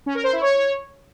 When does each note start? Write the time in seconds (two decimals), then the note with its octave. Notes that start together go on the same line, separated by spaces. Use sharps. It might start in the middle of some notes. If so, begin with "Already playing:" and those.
0.06 C#4
0.15 A#4
0.24 C5
0.32 E4
0.41 C#5